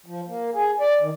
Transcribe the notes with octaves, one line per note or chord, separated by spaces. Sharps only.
F3
A#3
G#4
D5
D#3